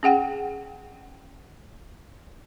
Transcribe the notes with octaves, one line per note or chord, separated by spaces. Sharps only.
C#4 G#4 F#5 G5